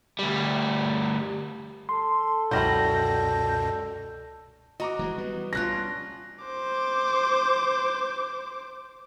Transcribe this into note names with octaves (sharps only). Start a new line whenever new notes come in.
D2 G3
A4 C6
C#2 F#2 B2 F#3 G3 E4 G6 A#6
F#4 D#5 A#5 D6
E3 F#3 G#3
G3 B3
C#4 D4 F4 F#6 A#6
C5 D6